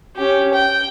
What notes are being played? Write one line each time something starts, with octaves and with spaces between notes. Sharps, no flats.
C#4 G4
G5